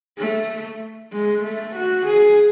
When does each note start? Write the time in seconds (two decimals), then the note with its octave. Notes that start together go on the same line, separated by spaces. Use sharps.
0.19 A3
1.13 G#3
1.43 A3
1.76 F#4
2.06 G#4